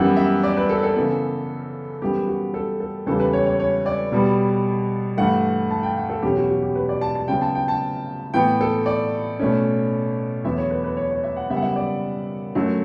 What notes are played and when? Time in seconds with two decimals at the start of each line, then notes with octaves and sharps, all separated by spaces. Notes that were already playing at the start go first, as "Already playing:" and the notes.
Already playing: F#2 E3 G3 B3 F#5
0.17 E5
0.43 D5
0.57 B4
0.69 A4
0.83 A4
0.96 C#3 E3 B3
2.02 F#2 E3 G3 B3 G4
2.27 F#4
2.54 A4
2.80 A4
3.06 E2 C#3 E3 G3 A4
3.20 B4
3.33 C#5
3.46 C#5
3.60 C#5
3.86 D5
4.12 B2 G3 B3
5.17 G2 E3 A3 F#5
5.71 A5
5.83 G5
5.96 F#5
6.09 A4
6.22 E2 B2 F#3 C#4 G4
6.36 F#4
6.49 F#4
6.62 G4
6.75 B4
6.89 D5
7.01 A5
7.15 A5
7.28 C#3 F#3 B3 G5
7.41 A5
7.55 G5
7.68 A5
8.34 A2 E3 B3 G5
8.61 A4
8.86 D5
9.39 B2 A3 C#4
10.44 E2 D3 F#3 B3 E5
10.58 C#5
10.71 B4
10.84 B4
10.97 C#5
11.10 C#5
11.24 E5
11.36 F#5
11.50 F#2 C#3 G3 B3 E5
11.57 F#5
11.62 E5
11.76 D5
12.55 F#2 D3 F#3 A3